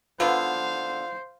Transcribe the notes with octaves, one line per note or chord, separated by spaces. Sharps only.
D3 B3 F4 C5 F5